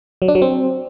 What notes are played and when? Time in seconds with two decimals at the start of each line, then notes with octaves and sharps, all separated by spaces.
0.22 F#3
0.28 D4
0.35 F#3
0.42 C4